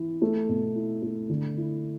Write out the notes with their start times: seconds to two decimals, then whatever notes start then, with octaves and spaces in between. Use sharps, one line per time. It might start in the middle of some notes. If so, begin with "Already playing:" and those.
Already playing: E3
0.22 A3
0.49 B2
0.75 E4
1.02 A3
1.29 D3
1.57 E4